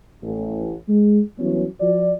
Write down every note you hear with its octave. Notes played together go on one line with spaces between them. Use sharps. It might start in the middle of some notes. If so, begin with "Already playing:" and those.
A1
G#3
E3 F#3 G3 B3 C#4
F3 F#4 D5